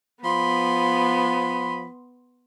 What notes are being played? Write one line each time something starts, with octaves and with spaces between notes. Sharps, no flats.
F3 B3 B5 C6